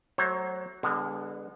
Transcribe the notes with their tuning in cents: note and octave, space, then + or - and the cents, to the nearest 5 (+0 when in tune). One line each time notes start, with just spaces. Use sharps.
F#3 +15 A3 +0 C5 +40
D3 +0 G#3 -40 B3 +15